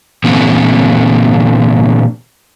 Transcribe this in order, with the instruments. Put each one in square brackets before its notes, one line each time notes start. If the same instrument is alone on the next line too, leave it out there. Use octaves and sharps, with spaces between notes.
[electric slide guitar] A#2 D3 E3 B3 C4